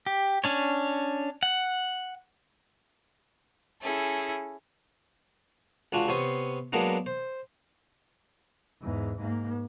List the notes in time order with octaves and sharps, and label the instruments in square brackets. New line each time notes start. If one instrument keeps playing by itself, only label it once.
[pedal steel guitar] G4
C#4 D4 C#5
F#5
[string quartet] C#4 E4 G#4 A4
[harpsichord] C#2 D4 F4 F#4 G#5
C3 B3 C#5 C6 D#6
F#3 G#3 A#3 B3 D4 D#4
C5
[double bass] E2 G#2
G#2 A#3